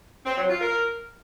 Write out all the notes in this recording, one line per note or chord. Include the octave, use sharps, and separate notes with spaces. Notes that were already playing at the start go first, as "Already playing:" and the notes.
C4
F#3
F4
A#4